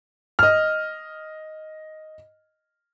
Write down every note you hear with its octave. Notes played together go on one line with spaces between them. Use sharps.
D#5 F6